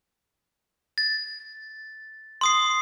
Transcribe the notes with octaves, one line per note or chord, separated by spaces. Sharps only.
A6
C6 D#6 C7